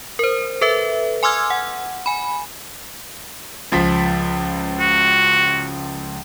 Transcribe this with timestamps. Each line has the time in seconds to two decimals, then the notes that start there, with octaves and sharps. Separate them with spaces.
0.19 A#4 C5
0.61 A4 B4 E5
1.23 G#5 C6 D6 E6 F6 G#6
1.50 F#5
2.06 G#5 B5
3.72 C#2 F3 B6
4.80 F#4